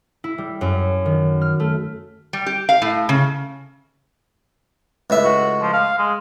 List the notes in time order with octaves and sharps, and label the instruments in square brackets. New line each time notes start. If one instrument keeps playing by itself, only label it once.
[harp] E4
G3
F#2
D#3
F6
A3
[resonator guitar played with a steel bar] G3
G4
F5
A2
C#3
[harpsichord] C#2 A2 E5
[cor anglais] F#4
F3
F5
G#3